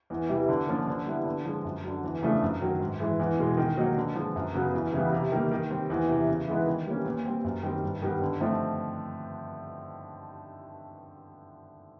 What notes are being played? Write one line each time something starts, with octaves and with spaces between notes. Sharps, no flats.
E2
C3 E3 G3
D3
F3 A#3 C#4
D3
G3 B3 E4
D3
F3 G#3
F#2
D3 F#3
E2
C#3 F3 A3 D4
F#2
D#3 F#3
G#2
E3 G#3
E2
B2 G#3
D#3
F#3 A#3 D#4
D3
F3 G#3
F#2
C#3 F#3 B3
E2
C#3 E3 G3 B3
C3
D#3 G3 A#3
D#3
G3 C4
E2
C3 E3
C#3
E3 G#3 B3 D#4
D#3
G3 A#3 C#4
A#2
G3 C4
F#2
D#3 G3 C4
G2
D#3 G3 B3
D3
F3 A3 C4 D#4